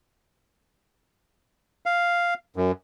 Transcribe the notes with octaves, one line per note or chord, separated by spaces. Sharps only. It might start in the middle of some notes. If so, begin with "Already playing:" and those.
F5
F#2